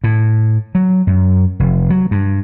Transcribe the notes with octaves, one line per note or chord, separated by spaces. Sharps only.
A2
F#3
F#2
F1
F#3
G2